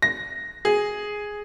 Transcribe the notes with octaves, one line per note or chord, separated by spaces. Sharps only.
A#6
G#4